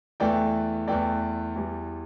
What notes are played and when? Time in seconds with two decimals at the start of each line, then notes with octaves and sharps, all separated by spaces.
0.20 E2 E3 A3 D5 G5
0.88 E2 E3 A3 D5 G5
1.56 E2 E3 G3